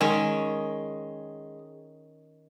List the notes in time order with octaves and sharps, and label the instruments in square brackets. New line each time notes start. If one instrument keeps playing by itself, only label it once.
[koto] D#3 C#4 [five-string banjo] G#3